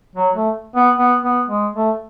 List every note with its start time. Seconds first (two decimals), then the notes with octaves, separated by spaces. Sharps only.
0.16 F#3
0.35 A3
0.75 B3
0.96 B3
1.22 B3
1.48 G#3
1.76 A3